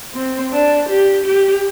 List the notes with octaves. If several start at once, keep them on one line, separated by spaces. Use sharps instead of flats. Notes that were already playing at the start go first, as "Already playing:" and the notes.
C4
D4
G4
G4